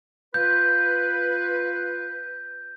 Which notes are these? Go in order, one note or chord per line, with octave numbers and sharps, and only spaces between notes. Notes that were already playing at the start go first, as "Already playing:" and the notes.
F4 B4 G6